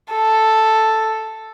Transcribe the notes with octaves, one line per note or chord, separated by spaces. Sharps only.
A4